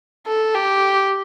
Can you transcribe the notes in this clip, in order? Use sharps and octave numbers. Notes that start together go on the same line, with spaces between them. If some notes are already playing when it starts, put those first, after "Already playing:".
A4
G4